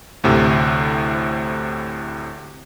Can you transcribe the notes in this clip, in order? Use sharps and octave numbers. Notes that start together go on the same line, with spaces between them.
D2 A2 C3